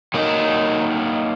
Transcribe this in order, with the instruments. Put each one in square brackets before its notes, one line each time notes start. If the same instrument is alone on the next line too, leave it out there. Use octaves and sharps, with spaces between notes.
[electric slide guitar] F#3 A#3 D#4 A#4 D#5